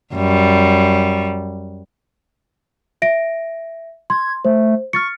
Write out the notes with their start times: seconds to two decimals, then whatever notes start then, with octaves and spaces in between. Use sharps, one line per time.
0.15 F#2 G3
3.02 E5 A#6 D7
4.10 C6 G#6
4.45 A3 C5
4.93 C#6 F6 A6 C#7